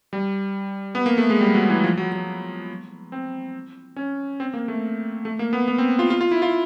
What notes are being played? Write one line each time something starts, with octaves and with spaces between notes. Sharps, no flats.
G3
B3
A#3
A3
G#3
G3
F#3
E3
F3
F#3
F#3
C4
C#4
C4
A#3
A3
A3
A#3
B3
B3
C4
F4
F4
F4
E4
F4